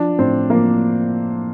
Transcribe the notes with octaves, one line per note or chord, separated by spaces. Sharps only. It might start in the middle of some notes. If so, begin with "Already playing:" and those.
Already playing: F3 D4
A2 C4
F3 A#3